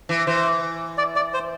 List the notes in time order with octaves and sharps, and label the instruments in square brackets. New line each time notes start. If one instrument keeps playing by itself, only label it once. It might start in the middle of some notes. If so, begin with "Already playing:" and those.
[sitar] E3
[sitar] E3 [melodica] C5
[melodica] D5
D5
C5